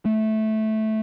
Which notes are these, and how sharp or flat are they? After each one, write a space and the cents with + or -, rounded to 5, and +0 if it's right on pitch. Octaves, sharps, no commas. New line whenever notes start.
A3 -10